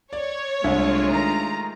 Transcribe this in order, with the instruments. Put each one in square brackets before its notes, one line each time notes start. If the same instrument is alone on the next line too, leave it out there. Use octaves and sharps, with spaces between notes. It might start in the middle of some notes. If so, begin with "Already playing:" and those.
[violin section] C#5 [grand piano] D5
[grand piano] C2 [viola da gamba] G#3 A3 F4 [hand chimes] D4
[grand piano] D#3 [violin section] A#5